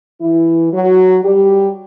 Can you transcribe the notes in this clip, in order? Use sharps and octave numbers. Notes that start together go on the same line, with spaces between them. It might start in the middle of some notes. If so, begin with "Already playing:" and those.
E3 E4
F#3 F#4
G3 G4